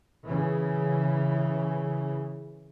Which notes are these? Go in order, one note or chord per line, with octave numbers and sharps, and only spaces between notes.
C#3 E3